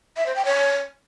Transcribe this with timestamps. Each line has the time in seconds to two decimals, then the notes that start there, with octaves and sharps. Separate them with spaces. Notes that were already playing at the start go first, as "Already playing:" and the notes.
0.17 E5
0.26 C5
0.36 G5
0.45 C#5